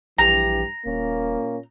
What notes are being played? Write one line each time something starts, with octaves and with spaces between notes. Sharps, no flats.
A#1 G2 E3 G4 A#5
D#1 A#2 A#3 C#4